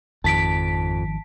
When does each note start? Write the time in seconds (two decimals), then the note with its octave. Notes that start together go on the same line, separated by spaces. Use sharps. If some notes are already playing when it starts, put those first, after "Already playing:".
0.24 G#1 F2 D#3 F3 A5 B6 D7